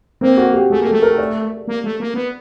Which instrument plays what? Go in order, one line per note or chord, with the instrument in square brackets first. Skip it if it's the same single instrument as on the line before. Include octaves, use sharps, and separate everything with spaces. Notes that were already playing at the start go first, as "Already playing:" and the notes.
[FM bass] A#3 [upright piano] C4
[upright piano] F#4
G4
[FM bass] A3 [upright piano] G#4
[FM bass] A#3
[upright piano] A4
[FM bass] A3
[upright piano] A#4
D5
[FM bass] A#3
A3
A#3
B3